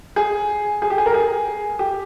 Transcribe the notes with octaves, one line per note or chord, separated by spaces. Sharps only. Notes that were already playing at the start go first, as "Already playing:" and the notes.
G#4
G#4
G4
G#4
A#4
G#4
G4